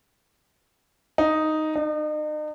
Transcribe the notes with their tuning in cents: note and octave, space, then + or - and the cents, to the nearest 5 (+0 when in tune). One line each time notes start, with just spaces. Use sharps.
D#4 +0
D#4 -40